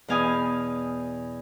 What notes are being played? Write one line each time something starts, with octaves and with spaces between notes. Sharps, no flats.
E2 B2 F5 G#5 D#6